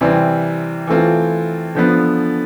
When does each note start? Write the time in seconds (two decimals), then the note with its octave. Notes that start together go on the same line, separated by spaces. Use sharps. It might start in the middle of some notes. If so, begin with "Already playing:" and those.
0.01 C3 E3 G3 C4
0.87 E3 A3 C4 F4
1.75 D3 F3 B3